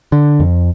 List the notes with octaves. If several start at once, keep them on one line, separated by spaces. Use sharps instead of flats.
D3
F2